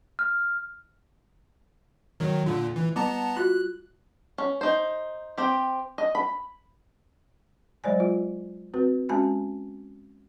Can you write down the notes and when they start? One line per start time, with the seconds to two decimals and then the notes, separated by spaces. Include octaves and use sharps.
0.19 F6
2.20 D#3 F#3
2.46 A#2 D3 F4
2.76 E3
2.96 G3 B3 A5 A#5
3.37 F4 F#4 F#6
4.38 C#4
4.61 D#4 C5
5.38 C4 G4
5.98 D#5
6.15 B5
7.84 F#3 G#3 C5 D5 G#5
8.00 F4
8.74 C4 F#4 B4
9.09 G#3 C#4 F#4 G#5 A5 B5